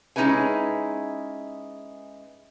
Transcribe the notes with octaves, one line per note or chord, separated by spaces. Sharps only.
G#3 C#4 D#4 E4 B4 G#5